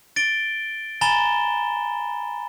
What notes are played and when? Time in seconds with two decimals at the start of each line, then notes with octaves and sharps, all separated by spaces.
0.16 A6 D7 G7
1.01 G#5 A#5 B5 A6 E7 G7